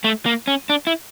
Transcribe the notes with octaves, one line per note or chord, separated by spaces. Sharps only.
A3
A#3
C#4
D4
E4